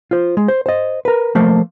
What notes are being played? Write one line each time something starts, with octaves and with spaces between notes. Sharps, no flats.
F4 C5
G#3
C5
C5 D#5
A#4 B4
F3 A3 A#3 C5